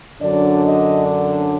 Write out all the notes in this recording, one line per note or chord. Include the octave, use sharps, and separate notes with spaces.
F#2 D3 F#3 D4 D5
D#5